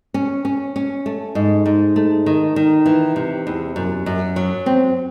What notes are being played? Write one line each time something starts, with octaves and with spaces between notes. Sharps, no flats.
C#4
C#4
C#4
A3
G#2
G#2
A3
D#3
D#3
E3
C3
E2
F#2
F#2
F#3
C4